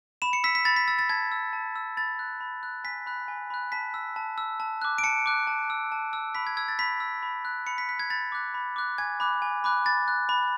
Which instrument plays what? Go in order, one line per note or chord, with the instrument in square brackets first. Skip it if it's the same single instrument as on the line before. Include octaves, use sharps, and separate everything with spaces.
[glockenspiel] B5 E7
C#7
E6 B6
B6
B5 A6
B6
E6 A6
A6
A5 G#6
E6
A5
E6
B5 A6
F#6
B5
F#6
G#5 B6
B5 F#6
G#5
B5 F#6
A5 B6
E6
A5
E6
A5
D6 F#6
D7
A5 C#7
D6 F#6
A5
E6
A5
E6
B5 B6
G#6
E6 G#6
A6
B5 B6
E6
B5
F#6
B5 C#7
B6
F#6 B6
G#6
B5 A6
D6 F#6
B5
D6 F#6
G#5 G#6
B5 D6 F#6
G#5
B5 D6 F#6
B5 A6
F#6
B5